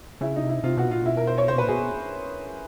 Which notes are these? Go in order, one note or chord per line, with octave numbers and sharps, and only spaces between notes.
C#3 E4
D#4
C3
E4
C3 F4
B2 F#4
A#2 F4
B2 E4
A#4
C5
C#5
C3 C5
B2
A#2 B4
B2 G#4